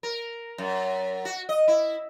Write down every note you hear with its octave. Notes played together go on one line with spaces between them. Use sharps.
A#4
F#2
F#4
D#5
E4